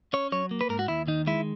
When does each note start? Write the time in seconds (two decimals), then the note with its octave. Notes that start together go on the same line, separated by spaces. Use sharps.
0.13 C#4 C#5
0.32 F#3 C#5
0.51 A#3
0.61 B4
0.69 G#2 A#4
0.79 F#4
0.88 D#2 E4
1.07 D#3 D#4
1.27 G#3 E4